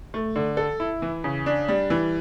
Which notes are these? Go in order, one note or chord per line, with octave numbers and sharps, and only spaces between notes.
A3
D3
A4
E4
E3
C#3
D4
G3
E3